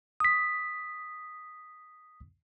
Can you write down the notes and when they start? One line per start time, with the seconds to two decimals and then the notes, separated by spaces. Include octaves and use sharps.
0.20 D#6 B6